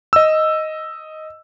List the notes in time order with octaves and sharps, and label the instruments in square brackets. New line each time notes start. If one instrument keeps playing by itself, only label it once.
[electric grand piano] D#5 E6